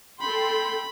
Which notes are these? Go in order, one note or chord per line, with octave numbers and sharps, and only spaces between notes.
A4 G5 B5 C6